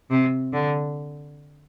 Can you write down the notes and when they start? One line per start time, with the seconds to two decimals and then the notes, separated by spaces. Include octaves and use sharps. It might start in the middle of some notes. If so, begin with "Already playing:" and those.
0.10 C3
0.53 D3